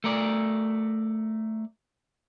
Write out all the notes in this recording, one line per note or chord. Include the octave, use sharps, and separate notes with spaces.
A3 A#4 D5